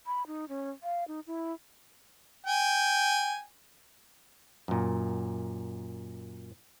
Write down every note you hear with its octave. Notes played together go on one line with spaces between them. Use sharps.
B5
D#4
C#4
F5
D#4
E4
G5 G#5
F#2 A#2